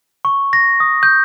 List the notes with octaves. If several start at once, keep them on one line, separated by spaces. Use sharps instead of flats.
C#6
A#6
D#6
G6